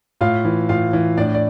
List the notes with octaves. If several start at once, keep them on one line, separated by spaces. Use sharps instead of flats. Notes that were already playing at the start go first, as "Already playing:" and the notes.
A2 F4 F5
E3
A2 F4 F5
E3
A2 D4 D5
D5